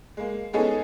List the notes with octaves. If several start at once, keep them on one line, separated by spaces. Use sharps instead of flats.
G#3 A#3
G#3 B3 C#4 D#4 G#4 A4